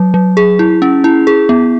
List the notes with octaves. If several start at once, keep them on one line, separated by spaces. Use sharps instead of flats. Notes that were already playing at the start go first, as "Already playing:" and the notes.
Already playing: F#3
F#3
G#4
E4
C#4
E4
G#4
B3